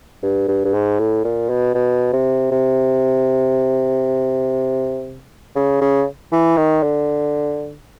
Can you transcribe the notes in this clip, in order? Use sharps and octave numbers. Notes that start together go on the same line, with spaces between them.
G2
G2
G2
G#2
A2
A#2
B2
B2
C3
C3
C#3
C#3
E3
D#3
D3